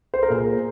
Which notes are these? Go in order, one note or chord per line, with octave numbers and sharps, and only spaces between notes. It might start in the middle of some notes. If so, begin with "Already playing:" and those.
C5
A#4
A#2 G#4